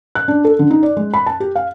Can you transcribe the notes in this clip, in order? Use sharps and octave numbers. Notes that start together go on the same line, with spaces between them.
F#6
D4
A4
D3
D#4
D5
G#3
B5
A5
G4
F5